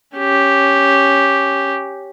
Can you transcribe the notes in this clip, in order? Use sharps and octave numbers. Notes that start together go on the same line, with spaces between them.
C#4 G4